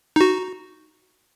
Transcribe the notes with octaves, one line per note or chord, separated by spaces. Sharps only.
D#4 F#4